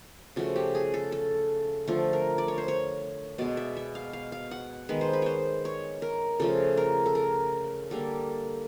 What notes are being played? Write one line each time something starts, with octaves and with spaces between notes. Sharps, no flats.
C#3 F3 A3 F#4
G4
G#4
A4
A4
D3 F3 A3 A4
A#4
D5
C#5
C5
C#5
B2 G#3 B3 D5
E5
E5
F5
F5
F5
F#5
D#3 G#3 B3 B4
C5
B4
C5 C#5
C#5
A#4
C#3 F3 A3 A4
A#4
A4
A#4
D3 G3 A#3 A4